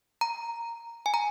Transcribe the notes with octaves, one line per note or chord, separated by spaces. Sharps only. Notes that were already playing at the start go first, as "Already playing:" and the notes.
A#5
G#5
A#5